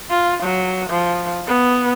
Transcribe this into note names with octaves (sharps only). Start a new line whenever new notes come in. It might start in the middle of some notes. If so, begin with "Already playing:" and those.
F4
F#3
F3
B3